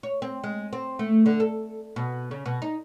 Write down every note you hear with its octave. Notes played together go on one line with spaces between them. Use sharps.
C#5
C4
G#3
C4
A3
D3
A4
B2
C#3
B2
D#4